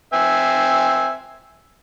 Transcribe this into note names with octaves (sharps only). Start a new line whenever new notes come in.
C4 E5 G#5